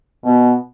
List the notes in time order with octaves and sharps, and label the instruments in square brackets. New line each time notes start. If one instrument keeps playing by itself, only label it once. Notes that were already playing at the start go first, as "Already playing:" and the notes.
[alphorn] B2